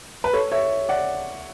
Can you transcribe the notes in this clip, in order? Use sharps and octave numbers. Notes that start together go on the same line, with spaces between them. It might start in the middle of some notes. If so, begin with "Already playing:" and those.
B4
A4 C#5
C#5 E5
D5 F#5